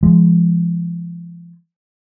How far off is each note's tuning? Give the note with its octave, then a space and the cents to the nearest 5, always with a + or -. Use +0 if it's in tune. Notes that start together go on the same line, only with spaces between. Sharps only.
F3 -35 G#3 +0